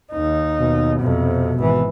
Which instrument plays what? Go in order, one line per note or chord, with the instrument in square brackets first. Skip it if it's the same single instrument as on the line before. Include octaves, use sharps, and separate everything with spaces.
[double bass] D#2 D#4
[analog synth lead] B2
[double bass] F2 C3
G#1 E3